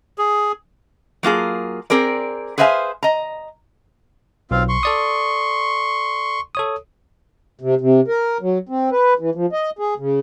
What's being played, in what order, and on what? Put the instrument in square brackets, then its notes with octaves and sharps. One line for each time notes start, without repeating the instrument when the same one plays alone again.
[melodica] G#4
[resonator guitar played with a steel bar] F#3 A#3 F4 G#4
C4 G#4 A#4 D5
G#4 B4 C5 E5 F5 G#5
D#5 A#5
[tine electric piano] B1 [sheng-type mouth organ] C4 F4 F5
[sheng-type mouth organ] C6 C#6
[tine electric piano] A4 D5 D#6
A4 C#5 D#6
[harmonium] C3
C3
A#4
F#3
C4
B4
E3
F3
D#5
G#4
C#3